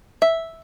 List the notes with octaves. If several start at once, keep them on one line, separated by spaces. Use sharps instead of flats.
E5